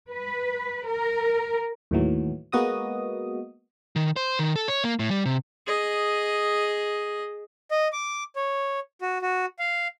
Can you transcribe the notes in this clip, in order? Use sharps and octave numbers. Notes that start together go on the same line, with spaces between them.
B4
A#4
D#2 A2 E3 F#3
G#3 A#3 B3 F#4 D#5 D#6
D#3
C5
D#3
A4
C#5
A#3
A2
G3
C3
G#4 D#5
D#5
D6
C#5
F#4
F#4
F5